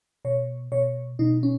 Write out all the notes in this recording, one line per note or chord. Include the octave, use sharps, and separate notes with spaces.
B2 C#5
B2 C#5
B2 D#4
C#4